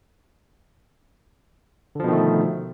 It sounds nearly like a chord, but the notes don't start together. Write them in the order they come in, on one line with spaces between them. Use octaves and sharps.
D3 F3 B2 D#3 A3